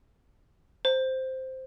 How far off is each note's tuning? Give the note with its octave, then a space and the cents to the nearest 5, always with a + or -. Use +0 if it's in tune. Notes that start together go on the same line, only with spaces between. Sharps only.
C5 -5